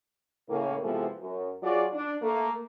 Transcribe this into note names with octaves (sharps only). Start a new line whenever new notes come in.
A2 C#3 A#3
C3 E3 F3 G#3 B3 A4
F#2
F#3 F4 F#4 G#4 D5
D4
A3 A#3